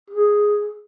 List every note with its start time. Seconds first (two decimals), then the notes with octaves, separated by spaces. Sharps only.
0.10 G#4